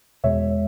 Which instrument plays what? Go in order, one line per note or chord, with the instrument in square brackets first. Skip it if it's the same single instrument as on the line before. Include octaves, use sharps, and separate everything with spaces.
[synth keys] E2 B2 G#3 C#5 E5